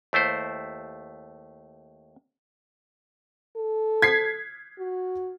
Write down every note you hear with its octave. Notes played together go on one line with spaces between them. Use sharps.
D#2 A3 E4 C5
A4
G#6 B6 C7
F#4